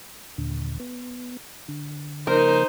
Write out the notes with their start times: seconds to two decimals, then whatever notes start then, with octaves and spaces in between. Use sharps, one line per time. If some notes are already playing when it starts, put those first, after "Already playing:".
0.38 D#2 A#2 D3
0.80 B3
1.68 D3
2.27 C#3 F3 A#3 D#4 A#4 C5